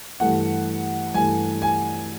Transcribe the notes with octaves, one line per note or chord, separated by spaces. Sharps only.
G2 E3 A3 F#5
G2 E3 A3 G#5
G#5